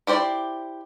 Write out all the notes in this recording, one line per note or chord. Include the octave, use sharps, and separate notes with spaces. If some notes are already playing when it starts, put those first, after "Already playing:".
E4 G4 C5 D5